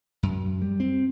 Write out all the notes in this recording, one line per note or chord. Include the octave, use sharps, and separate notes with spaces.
F#2
G3
C4